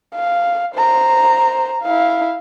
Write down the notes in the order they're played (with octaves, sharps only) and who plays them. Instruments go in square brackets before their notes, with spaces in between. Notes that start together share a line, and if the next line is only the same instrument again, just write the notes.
[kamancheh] F5
C5 A#5
E4 F5